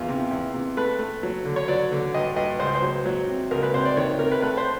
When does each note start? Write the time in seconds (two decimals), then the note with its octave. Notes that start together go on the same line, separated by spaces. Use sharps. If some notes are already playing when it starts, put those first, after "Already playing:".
Already playing: E2 D#3 F4
0.08 C3
0.31 E2
0.54 C3
0.77 A3 B4
0.99 A3
1.23 F#3
1.45 D3
1.56 C#5
1.68 F#3 D5
1.92 D3
2.14 G2 D#5
2.36 G2 D#5
2.60 C#2 C5
2.75 C5
2.82 F#3
3.06 F#3
3.28 C3
3.51 C#2 A#4
3.63 B4
3.74 C3 C5
3.85 D5
3.97 D#3 C#5
4.19 C3 A#4
4.32 B4
4.42 A3 B4
4.57 C5